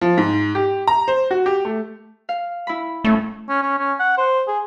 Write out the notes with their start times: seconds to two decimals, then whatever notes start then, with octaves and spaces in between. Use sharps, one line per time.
0.01 F3
0.17 G#2
0.55 G4
0.88 A#5
1.08 C5
1.31 F#4
1.46 G4
1.65 A3
2.29 F5
2.67 E4 B5
3.04 A2 A3 C#4
3.49 C#4
3.63 C#4
3.78 C#4
3.99 F#5
4.17 C5
4.47 G#4